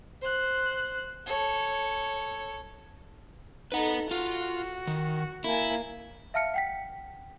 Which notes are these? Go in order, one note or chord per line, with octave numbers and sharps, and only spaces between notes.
C5 F#6
A4 C#5
D#4 A4 B4 F#5
F4 F#4
D#3
A#3 E4 G#5
E5 F5 A5 F6 C#7
F#5 G5 B6